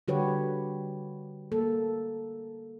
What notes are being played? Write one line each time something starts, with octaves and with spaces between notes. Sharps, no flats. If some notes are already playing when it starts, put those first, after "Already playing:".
D3 G3 F#4 G4 B4 C#5
A#3 A4